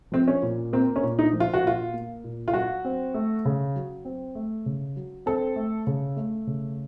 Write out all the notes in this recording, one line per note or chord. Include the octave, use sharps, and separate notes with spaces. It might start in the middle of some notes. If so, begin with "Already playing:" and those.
F3 C4
C#4
A#2
A#3 C4
C#4
A#2
D#4
F3
F4
F#4
A#2 F4
A#3
A#2
F4
F#3 F#4
C4
A3
C#3
F#3
C4
A3
C#3
F#3
C4 A4
A3
C#3
A3
C#3